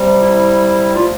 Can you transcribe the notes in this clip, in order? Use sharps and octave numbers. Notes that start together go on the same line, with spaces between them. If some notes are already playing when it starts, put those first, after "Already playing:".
Already playing: C3 G3 C4
E4
F3 A3 D4 F4